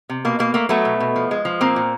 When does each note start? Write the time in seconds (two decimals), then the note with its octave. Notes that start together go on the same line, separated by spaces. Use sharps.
0.09 C3
0.25 B2 A#3
0.39 B2 A#3
0.54 A3 A#3
0.69 F#3 A3 B3
0.85 B2
1.00 B2
1.16 F3
1.31 G#3
1.45 F3
1.61 A#2 A#3 C4
1.76 A#2